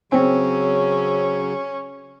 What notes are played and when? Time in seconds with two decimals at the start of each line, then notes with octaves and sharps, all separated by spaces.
0.12 C#3 F#3 C4 C#4